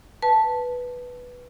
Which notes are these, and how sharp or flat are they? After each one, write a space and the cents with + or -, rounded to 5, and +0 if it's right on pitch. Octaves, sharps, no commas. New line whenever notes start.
B4 +0 A5 +0